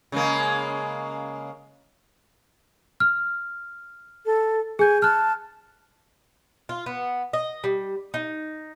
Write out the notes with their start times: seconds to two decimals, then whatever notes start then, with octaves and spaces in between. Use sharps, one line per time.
0.12 C#3 G#3 A#3
3.00 F6
4.25 A4
4.79 G#4 G#5 G6
5.02 A5 F6 F#6
6.69 F4
6.86 B3
7.33 D#5
7.64 G3
8.14 D#4